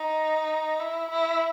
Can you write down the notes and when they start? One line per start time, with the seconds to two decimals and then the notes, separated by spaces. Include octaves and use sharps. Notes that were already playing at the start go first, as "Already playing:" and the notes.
Already playing: D#4
0.80 E4
1.11 E4